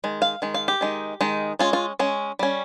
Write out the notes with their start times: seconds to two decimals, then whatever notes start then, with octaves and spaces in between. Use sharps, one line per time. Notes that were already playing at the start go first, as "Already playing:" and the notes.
0.04 D#3 G#3
0.22 F5
0.42 D#3 G#3
0.54 F5
0.68 G4
0.81 D#3 G#3 D#4
1.21 D#3 G#3 D#4
1.59 G#3 C#4 F4
1.73 F4
1.99 G#3 C#4
2.39 G3 C#4